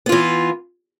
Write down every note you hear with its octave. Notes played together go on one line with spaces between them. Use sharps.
E3 B3 F4